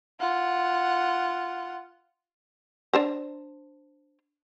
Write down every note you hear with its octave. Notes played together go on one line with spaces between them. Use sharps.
F4 F#5
D4 C5 A#5